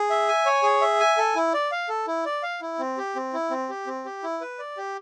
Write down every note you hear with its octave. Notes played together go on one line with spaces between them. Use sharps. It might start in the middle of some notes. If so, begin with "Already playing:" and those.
Already playing: G#4
E5
G#5
C#5
G#4
E5
G#5
A4
E4
D5
F5
A4
E4
D5
F5
E4
C4
G4
C4
E4
C4
G4
C4
G4
E4
B4
D5
G4